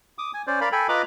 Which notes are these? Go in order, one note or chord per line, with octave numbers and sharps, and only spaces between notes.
D6 D#6
G#5
C#4 C5 D5
A#4 D5 F5 B5
A4 G5 G#5 B5
F4 B4 D#5 A#5 B5 D6